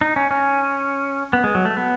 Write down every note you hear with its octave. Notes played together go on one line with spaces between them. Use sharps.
D#4
C#4
C#4
B3
G#3
F#3
A3
B3